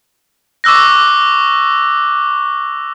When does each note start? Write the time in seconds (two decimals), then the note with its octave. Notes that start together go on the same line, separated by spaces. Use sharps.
0.64 C#6 D6 E6 F#6 A#6